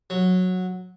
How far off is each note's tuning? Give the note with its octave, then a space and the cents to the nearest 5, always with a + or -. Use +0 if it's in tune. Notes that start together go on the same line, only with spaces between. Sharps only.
F#3 -10